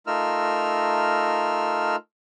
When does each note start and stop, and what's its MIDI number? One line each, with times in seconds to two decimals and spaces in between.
0.07 1.96 57
0.07 1.96 63
0.07 1.96 65
0.07 1.96 70
0.07 1.96 88
0.07 1.96 89